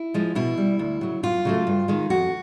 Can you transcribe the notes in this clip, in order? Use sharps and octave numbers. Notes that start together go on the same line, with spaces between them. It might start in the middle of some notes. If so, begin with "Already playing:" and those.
Already playing: E4
F3 G#3
B2 E4
G3
D2
C#3 F#3
F#2 F4
C#3 F#3 A3
G2
D#3 G#3
F2 F#4